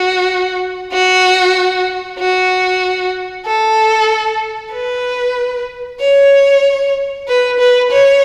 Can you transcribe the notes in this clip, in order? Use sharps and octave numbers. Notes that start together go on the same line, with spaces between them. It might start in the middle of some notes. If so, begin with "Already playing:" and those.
Already playing: F#4
F#4
F#4
A4
B4
C#5
B4
B4
C#5